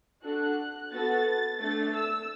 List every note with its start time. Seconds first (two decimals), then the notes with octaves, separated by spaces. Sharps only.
0.23 D4 F#4 A4 F#6
0.91 B3 F#4 A4 A6
1.60 A3 D4 A4 A6
1.94 E6